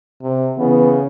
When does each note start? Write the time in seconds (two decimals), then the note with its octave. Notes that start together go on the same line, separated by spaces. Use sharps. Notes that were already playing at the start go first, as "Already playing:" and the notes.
0.22 C3
0.58 C#3 E3 B3